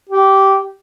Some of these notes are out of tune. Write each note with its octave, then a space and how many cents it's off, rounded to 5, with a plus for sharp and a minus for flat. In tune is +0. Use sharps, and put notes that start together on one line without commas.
G4 -15